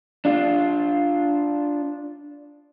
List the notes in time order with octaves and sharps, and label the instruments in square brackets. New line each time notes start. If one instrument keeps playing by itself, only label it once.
[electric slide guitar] D4 F4